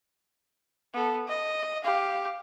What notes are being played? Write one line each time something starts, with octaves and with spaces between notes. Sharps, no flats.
B3 A4
D#5
G4 F5